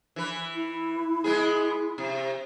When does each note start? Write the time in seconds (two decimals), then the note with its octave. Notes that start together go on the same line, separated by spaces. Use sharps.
0.16 E3 B4
0.55 E4
1.24 G#3 B3 G#4
1.98 C3